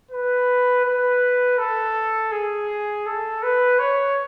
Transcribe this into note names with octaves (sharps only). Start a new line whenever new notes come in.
B4
B4
A4
G#4
A4
B4
C#5